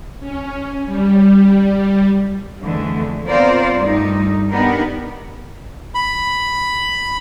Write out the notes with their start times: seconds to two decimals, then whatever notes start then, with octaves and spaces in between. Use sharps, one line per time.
0.20 C#4
0.86 G3
2.63 F2 D3 E3 G#3 A3
3.26 B3 C4 F4 A#4 C5 D5
3.75 G2 G3 A3 D#4
4.51 B3 D4 D#4 G4 A#4
5.95 B5